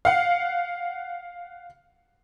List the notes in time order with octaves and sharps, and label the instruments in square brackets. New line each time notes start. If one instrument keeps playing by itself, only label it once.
[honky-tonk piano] F5 F#5